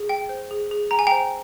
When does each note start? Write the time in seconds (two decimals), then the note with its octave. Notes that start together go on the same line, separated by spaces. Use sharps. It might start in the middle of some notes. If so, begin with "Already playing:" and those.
Already playing: G#4
0.09 G5
0.29 C5
0.51 G#4
0.71 G#4
0.91 G5 A#5
0.99 G#5
1.07 C5 G5 A#5